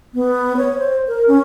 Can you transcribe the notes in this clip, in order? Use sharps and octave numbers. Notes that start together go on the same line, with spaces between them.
B3
C#5
C5
A#4
C#4